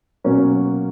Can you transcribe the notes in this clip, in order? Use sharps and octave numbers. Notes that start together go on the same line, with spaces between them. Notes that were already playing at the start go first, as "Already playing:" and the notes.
B2 F#3 A#3 C#4